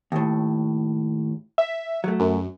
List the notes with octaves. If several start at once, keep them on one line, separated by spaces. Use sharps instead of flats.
D#2 A2
E5
F#3 A3
F#2